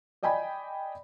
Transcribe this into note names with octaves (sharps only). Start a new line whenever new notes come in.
D5 D#5 G5 G#5 B5